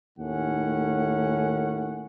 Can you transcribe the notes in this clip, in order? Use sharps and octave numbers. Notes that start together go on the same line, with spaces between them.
D#2 A2 D#3 A3 C#4 F#5